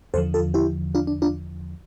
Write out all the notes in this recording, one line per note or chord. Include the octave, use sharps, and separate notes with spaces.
E2 D3 F3 A4 C5
F4 A4
E4 G4
D4 F4
D4
D4 F4